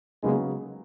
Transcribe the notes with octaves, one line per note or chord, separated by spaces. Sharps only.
C#3 F#3 G#3 A#3 B3 D#4